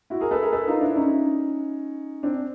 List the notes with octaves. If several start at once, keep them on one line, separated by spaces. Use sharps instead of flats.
E4 F#4
G#4 A#4
A4 B4
G#4 A#4
A4 B4
D#4 F4
D4 E4
C#4 D#4
C4 D4